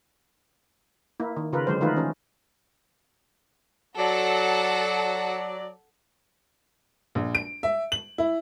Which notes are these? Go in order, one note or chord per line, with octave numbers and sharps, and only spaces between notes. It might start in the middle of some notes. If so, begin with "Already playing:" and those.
A#3 E4
D#3
C#3 F4 A#4 B4
D3 F#3 G#3 C5
D#3 E3 A3 D#4 F4 B4
E3 C#4
F#3 A4 D5 F#5
A#1
D7
E5
F#7
E4